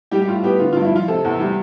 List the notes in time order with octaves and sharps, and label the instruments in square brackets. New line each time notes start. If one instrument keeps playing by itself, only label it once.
[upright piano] G3 G4
G4
A2 F4
B3 G4
D3 F4
F4
G2
E4
F3 F4
C3 A4
E2
G3